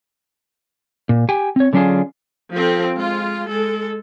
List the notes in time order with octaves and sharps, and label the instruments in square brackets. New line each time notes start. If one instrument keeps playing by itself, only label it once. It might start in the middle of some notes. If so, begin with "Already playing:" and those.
[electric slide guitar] A#2
G4 G5 G#5
C4 C#5
D3 F#3 C#4 D4 F4 G#4
[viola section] F3 C4 A4
G#3 F4
G#3 A4